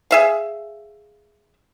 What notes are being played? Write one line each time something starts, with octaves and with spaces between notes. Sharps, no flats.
G#4 E5 F5